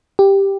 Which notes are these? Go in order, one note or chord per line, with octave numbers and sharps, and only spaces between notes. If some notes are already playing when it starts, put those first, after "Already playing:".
G4